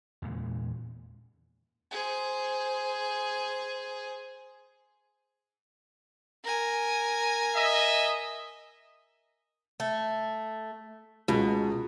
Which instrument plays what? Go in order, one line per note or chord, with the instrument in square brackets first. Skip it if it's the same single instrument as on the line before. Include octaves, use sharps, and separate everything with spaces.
[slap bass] E2 A#2 C#3 G#3
[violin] G#4 C5
[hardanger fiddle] A#4 G#5
[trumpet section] D#5 E5
[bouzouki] A3
[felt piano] C#2 [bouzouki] B2